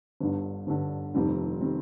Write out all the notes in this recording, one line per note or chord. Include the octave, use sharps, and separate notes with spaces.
G1 G2 D3
G1 G2 D3
F1 F2 D#3 G3 C4
D#3 G3 C4